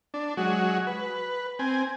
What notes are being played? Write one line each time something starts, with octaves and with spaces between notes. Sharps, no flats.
D4
F#3 G#3 F#4
B4
C4 G#5